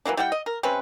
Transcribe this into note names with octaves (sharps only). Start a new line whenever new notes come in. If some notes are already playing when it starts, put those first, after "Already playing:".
E3 F#3 A#3 D4
G3 E4 F#5 G5
D#5
A#4
C3 C4 C#4 B4